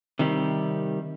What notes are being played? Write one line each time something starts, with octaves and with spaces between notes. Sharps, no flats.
C3 D#3 G3